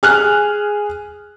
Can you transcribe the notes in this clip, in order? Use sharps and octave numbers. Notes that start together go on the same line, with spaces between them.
G#4 F6 F#6